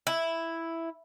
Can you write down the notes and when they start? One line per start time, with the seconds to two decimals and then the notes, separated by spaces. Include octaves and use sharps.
0.07 E4